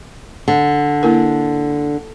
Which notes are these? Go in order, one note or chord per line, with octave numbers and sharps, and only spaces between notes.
D3
A#3 E4 A#4